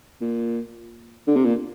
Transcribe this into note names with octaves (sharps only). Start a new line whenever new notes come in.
A#2
D3
C3
A#2